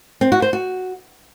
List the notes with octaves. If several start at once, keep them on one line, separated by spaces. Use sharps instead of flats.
C4
F#4
C5
F#4